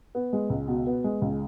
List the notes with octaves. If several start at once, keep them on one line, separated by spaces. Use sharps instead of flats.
B3
G#3
C#2
B2
B3
G#3
C#2